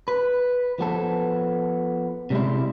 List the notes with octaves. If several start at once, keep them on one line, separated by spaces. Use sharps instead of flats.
B4
F3 B3 A4
C3 G3 G#3 E4